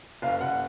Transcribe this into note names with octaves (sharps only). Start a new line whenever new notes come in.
F#1 F5
F#1 F#5